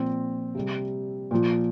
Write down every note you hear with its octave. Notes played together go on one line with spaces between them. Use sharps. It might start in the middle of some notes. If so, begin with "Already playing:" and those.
Already playing: A#2 F3 C4
C3 G3
A#2 F3